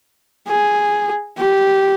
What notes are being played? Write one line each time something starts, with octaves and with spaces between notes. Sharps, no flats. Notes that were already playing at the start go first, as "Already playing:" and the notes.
G#4
G4